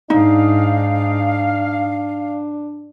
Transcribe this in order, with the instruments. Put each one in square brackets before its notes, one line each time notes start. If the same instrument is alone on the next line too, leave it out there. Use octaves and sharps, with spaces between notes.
[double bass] G#2 [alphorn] D4 [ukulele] D#4 [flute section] F5